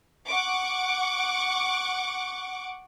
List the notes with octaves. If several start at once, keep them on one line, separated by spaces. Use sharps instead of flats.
F#5 C#6 D6